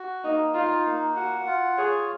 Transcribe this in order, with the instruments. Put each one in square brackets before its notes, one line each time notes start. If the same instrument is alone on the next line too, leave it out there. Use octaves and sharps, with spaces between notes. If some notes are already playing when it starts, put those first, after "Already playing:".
Already playing: [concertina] F#4
[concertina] A#3 [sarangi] D#4
[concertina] D#4 [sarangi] F4
[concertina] A#3
[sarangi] F#4 [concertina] F#5
[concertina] F4
[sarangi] G#4 [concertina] C#5